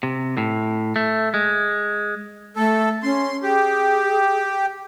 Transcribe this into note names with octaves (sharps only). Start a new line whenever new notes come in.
C3
A2
A3
G#3
A3 A4
C#4 C6
G4 G#4